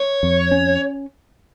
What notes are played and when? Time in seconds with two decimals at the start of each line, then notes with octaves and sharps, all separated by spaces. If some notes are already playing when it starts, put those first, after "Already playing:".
Already playing: C#5
0.23 F2
0.51 C#4